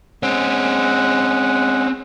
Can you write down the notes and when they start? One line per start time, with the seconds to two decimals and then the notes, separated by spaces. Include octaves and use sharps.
0.23 G#3 C4 C#4 F#5